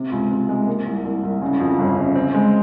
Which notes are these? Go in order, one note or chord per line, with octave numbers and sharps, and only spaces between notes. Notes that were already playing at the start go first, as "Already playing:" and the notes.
Already playing: C3
C#2
C3
G#3
A#3
C2
C2
C2
C#3
F2
G1
C#3
C4
G#3